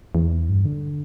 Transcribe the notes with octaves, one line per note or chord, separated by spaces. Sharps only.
E2
G2
D3